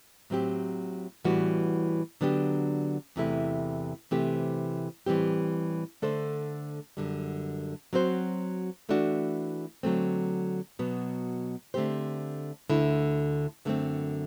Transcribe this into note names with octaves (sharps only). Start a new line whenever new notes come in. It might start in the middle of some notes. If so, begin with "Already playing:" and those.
A2 F#3 C4 G4
A2 E3 G3 B3 F#4
D3 F#3 B3 D4 G4
E2 C3 E3 A3 E4
C3 E3 A3 C4 G4
A2 E3 G3 C4 G4
D3 A3 D4 A4 C5
F#2 D3 G3
F#3 C4 F#4 C5
E3 A3 D4 F#4
D3 F#3 A3 C4
B2 F#3 B3
D3 A3 C4 G4 C5
D2 D3 A3 E4
F#2 D3 A3 C4